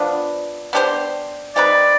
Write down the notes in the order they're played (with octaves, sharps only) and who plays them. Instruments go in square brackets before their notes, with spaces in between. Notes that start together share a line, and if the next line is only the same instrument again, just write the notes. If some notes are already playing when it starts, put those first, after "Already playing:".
Already playing: [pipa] F3 B3 D4
B3 D4 G4 C5
[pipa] G#3 C4 D#4 B4 [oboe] D5